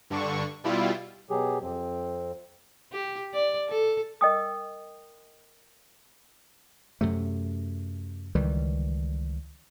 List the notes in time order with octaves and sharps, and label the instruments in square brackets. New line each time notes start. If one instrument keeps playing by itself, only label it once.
[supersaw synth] G2 D3 D4 C#6
B2 G3 E4 F4
[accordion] B2 F#3 G4 G#4
F2 C4
[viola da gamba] G4
D5
A4
[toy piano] A#4 D#5 G5 D#6
[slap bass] F#2 C3 A3
C#2 D#3 E3 G3